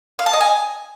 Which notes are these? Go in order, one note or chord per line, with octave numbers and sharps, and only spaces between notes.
F5
A5
D#5
G#5